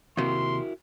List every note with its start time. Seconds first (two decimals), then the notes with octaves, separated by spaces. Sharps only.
0.17 D#2 C3 E4 F#4 A#4 C6